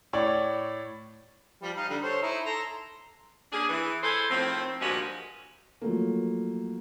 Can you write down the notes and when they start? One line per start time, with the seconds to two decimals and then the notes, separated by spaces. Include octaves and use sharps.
0.13 A2 C#5 D5
1.62 F3 G3
1.76 D#4 F5
1.89 D3 G3
2.03 A4 C5 C#5
2.22 D#4 E4 E5
2.45 A4 A#5 C6
3.53 A#3 C#4 D4 G#4
3.69 E3
4.03 E4 G#4 A4 B4 C5
4.30 A2 D#3 F3 C4
4.81 G2 A#2 F3 G#3 F#4 G4
5.82 F3 F#3 A3 A#3